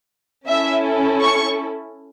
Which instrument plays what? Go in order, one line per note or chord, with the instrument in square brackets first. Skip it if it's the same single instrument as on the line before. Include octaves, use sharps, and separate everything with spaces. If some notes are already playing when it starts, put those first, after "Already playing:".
[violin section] C#4 E4 A4 E5
C#6